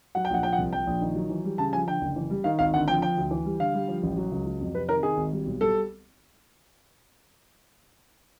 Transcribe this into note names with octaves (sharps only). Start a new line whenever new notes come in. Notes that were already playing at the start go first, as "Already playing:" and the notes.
F#3 F#5
G5
A#1 F#5
F3 G5
F#5
C2
F3 G5
A#1
D#3
F#3
E3
G3
C#3 A5
F3 G#5
D3 G5
F#1
E3
G3
D#3 F5
G#1 F5
D3 F#5
F3 G5
F3 G5
D2
E3
G3
D3 F5
G3
F3
A1
F#3
C#2
F#3
F2
C3 B4
D#3 A#4
D#3 G#4
G#1
G3
B1
G3 A4